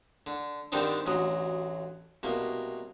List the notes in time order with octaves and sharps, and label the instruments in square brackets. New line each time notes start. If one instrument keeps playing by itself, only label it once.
[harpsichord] D3
G2 D3 D#3 C4 D4 D#4
A1 D2 F#3 D#5
C2 B2 A#3